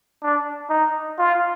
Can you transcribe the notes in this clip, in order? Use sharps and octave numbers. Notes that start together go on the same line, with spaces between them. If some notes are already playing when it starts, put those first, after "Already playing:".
D4
D#4
F4